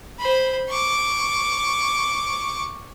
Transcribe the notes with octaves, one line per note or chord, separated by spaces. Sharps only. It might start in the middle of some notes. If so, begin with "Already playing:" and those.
C5 B5
C#6 D6